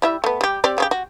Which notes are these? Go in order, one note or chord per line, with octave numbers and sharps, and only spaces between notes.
G3 E4 E5
A3 B3
G3 G4
C4 G4 D5
C#3 C#4 G4
F#4